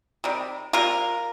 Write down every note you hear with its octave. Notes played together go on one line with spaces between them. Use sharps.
C3 D#3 G3
C3 G3 A#3 F4 A#4